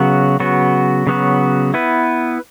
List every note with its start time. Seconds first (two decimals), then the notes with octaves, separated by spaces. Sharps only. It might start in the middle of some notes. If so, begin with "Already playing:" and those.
Already playing: C#3 F#3 B3 F#4
0.40 C#3 F#3 B3 F#4
1.07 C#3 F#3 B3 F#4
1.74 B3 E4 B4